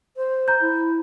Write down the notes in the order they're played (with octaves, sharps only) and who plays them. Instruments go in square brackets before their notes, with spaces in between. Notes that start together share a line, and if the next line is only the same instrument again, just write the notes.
[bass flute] C5
[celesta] A#5 G6
[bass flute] E4